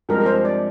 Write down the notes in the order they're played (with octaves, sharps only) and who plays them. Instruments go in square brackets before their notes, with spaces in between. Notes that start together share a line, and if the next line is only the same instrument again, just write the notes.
[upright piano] G2 F3 G#3 C4 G4 [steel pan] A#4
[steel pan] A#4
C5
D5